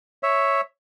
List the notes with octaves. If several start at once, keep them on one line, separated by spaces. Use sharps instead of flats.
C#5 E5